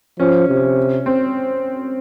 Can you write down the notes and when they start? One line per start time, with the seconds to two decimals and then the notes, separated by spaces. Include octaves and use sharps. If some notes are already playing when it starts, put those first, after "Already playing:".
0.19 F3 C#4
0.49 C3
1.06 C4